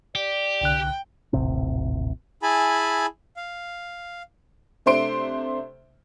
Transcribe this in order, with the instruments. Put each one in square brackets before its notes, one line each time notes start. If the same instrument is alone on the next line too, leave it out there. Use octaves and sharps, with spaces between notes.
[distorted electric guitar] G4 [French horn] D5
[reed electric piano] C2 D3 F#6 [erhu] G5
[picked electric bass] D#1 A1 C3 C4
[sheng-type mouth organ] E4 G#4 G#5 A5 B5
F5
[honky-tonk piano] C3 A3 D4 C5 C6 D7